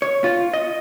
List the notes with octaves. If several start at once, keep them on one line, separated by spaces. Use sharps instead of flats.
C#5
F4
D#5